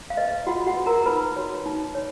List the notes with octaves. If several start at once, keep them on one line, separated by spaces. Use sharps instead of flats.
F5
B4 D#5
F4 F#4 F#5
F#4 F#5
B4
A#4 A#5
D#4 B4 B5
F#4 C#5
D#4
C#5